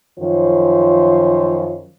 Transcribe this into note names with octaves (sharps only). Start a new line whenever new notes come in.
F#2 D#3 F3 F4 C5 C#5